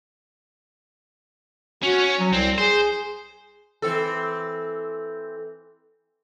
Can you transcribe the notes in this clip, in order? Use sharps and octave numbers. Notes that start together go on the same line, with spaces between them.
C#4 F#4
F#3
C2 C4
G#4 C5
E3 C4 A4